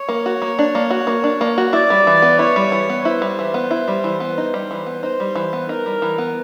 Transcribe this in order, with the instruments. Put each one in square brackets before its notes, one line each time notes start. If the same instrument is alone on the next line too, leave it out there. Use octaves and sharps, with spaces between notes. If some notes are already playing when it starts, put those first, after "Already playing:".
Already playing: [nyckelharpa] C#5
[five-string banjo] A#3
F#4
A#3
D4
A#3
F#4
A#3
D4
A#3
F#4
[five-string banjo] E4 [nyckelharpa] D5
[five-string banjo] G3
E3
B3
[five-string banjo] E4 [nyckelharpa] C#5
[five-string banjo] G3
E3
B3
[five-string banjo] E4 [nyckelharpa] C5
[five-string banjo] G3
E3
B3
E4
G3
E3
B3
D#4
G3
E3
B3
[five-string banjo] D#4 [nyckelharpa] C5
[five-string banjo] G3
E3
B3
[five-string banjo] D#4 [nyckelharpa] A#4
[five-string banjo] G3
E3
B3